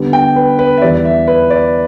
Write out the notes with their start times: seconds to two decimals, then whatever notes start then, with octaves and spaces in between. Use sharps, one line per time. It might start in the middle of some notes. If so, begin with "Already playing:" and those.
Already playing: D3 G3 B3
0.13 G5
0.36 B4
0.59 B4
0.78 E5
0.81 E2 E3 G3 D5
1.05 E5
1.28 B4
1.50 D5